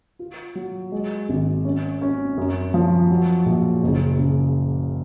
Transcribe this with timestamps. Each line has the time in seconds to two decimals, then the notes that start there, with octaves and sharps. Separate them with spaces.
0.19 F4
0.55 F#3
0.92 G#3
1.29 G#1
1.65 C#4
2.02 C#4
2.38 F#2
2.74 F3
3.10 F#3
3.46 A#1
3.83 F#1
4.19 C#3